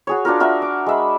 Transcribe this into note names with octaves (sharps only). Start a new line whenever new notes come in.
F#4 G#4 C#5
D4 F4 F#4 A#4
F#4 A#4 D5 E5
D6
G#3 E5 B5